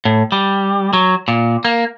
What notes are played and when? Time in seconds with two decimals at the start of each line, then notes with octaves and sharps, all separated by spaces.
0.05 A2
0.32 G3
0.93 F#3
1.28 A#2
1.65 A#3